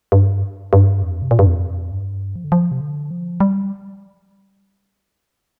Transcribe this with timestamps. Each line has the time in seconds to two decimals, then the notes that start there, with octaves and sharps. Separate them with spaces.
0.12 G2
0.73 G2
1.03 F2
1.22 C3
1.31 A#2
1.39 G2
1.47 F2
1.92 G2
2.36 F3
2.44 D3
2.52 F3
2.71 C3
2.81 D3
3.11 F3
3.40 G3